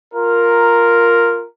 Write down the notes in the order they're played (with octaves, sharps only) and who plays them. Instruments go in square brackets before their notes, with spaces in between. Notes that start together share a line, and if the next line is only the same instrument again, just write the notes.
[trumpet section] F4 A#4